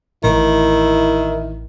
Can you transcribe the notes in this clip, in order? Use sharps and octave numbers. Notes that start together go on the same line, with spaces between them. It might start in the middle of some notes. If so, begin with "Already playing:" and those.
A1 D#3 E4